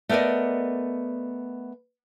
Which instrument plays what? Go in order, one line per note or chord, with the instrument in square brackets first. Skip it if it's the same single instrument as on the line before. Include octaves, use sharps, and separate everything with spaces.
[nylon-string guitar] A3 B3 A#4 B4 D5 D#5